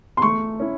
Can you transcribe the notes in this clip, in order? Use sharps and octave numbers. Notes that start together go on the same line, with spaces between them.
C6
A3 C#6
C#4 E4